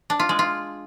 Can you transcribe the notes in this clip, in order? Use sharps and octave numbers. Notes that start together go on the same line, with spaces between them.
D4
F4
G#3
F4